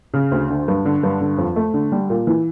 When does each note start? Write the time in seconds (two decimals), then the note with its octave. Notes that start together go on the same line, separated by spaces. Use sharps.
0.14 C#3
0.31 D2
0.50 D3
0.68 G2
0.86 D3
1.03 G2
1.21 D3
1.38 F2
1.56 A3
1.74 D3
1.92 G3
2.10 A#2
2.27 E3